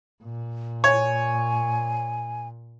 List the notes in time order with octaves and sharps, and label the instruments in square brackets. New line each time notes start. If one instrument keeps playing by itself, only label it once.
[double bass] A#2
[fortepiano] C#5 [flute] G#5